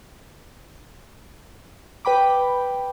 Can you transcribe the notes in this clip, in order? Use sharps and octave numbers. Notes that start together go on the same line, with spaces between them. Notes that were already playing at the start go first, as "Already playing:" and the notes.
B4 G5 B5 D6